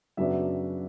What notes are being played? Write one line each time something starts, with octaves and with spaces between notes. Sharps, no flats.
F#2 C#3 F#3 B3 D4 E5